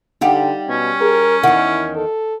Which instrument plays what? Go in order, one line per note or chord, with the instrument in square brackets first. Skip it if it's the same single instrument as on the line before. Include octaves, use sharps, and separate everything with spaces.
[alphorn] D3 [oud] G3 G4 [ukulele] D#4 F5 F#5
[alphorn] B2 [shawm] C#4
[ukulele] G#4 [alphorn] A#4
[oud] E2 D#3 [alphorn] E4 [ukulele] F#5
[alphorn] A4